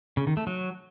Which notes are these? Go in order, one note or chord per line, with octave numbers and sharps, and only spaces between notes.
C#3
D#3
A3
F#3